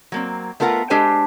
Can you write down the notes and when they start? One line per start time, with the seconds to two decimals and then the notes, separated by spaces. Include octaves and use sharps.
0.12 F#3 A#3 C4
0.60 A3 B3 F4 A#4 F#5
0.90 G#3 D4 G4 A4 C5 G#5